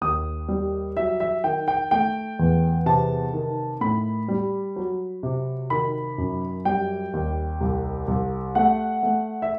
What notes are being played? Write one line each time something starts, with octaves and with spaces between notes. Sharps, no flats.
D#2 D#6
G3
F#3 E5
E5
D#3 G5
G5
A3 G5
E2
C3 A5
D#3
A2 B5
G3
F#3
C3
D#3 B5
F#2
G3 G5
D#2
C2
C2
A3 F#5
A3
E5